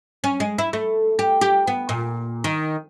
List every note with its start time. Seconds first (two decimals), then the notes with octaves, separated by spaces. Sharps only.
0.24 C#4
0.40 G#3
0.58 E4
0.73 A3
1.19 G4
1.41 G4
1.67 B3
1.89 A#2
2.44 D#3